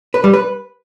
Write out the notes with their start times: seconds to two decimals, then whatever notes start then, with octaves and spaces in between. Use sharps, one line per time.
0.14 B4
0.24 G3
0.34 B4